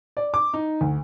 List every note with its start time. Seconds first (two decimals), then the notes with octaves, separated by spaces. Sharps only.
0.17 D5
0.34 D6
0.54 D#4
0.81 D2